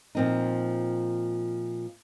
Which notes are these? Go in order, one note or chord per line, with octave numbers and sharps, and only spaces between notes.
A#2 F3 C4 D#4